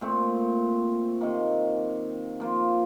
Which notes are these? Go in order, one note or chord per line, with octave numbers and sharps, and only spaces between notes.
A#2 A3 C4
C3 D#3 A#3
F3 A#3 F4